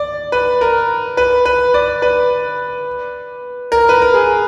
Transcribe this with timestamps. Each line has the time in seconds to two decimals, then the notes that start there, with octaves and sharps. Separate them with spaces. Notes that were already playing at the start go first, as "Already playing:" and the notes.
Already playing: D5
0.32 B4
0.61 A#4
1.17 B4
1.45 B4
1.74 D5
2.02 B4
3.72 A#4
3.89 B4
4.02 A#4
4.14 G#4